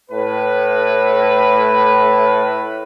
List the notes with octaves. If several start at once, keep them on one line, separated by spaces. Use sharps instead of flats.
A2 B4